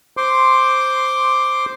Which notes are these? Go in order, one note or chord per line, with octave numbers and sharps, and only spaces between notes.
C5 C6 D6